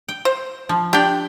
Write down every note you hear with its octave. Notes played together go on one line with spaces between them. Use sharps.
G5
C5
F3
D4 G4 D5 G5